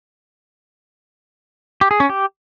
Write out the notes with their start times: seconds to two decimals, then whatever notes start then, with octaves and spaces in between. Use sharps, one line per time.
1.81 G4
1.91 G#4
2.00 C#4
2.09 G4